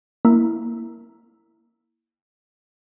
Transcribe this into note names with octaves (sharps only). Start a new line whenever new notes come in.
A#3 E4